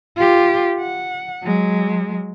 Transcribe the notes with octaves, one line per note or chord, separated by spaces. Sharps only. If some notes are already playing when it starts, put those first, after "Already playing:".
F4 G4
F#5
F#3 G#3